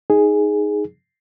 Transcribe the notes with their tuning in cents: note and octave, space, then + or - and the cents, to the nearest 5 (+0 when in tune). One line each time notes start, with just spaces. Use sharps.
D#4 +0 G#4 +0